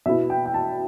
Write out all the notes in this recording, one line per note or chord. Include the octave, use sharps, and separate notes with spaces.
B2 B3 E4 E5
G5
G5
A5